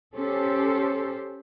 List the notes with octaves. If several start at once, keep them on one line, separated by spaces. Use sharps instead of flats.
C#4 G4 A4 C5